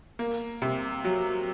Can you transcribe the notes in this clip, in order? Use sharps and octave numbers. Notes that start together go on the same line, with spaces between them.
A#3
C3
F#3